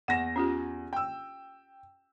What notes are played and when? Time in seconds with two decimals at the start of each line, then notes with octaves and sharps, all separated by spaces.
0.08 E2 F#5 A#6 E7
0.36 C#4 F4 G4
0.93 G5 E6